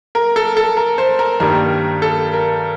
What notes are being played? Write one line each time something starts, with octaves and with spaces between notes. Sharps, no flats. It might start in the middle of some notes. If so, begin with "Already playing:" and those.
A#4
A4
A4
A#4
C5
A#4
G2 D#3 G3 A#3 A#4
A4
A#4